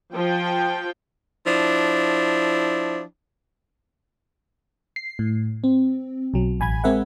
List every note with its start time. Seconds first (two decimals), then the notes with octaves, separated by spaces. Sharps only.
0.15 F3 G5
1.46 F3 D4 E4
4.96 C7
5.19 A2
5.64 C4
6.34 B1 F#3
6.60 A1 G#5 B5 G#6
6.84 G#3 C4 A#4 E5 F#5